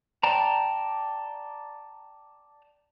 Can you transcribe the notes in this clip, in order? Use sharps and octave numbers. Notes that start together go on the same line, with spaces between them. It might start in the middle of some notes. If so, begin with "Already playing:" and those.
D5 G5 A5 A#5